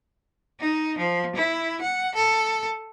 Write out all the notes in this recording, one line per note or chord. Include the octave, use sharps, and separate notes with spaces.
D#4
F3
E4
F#5
A4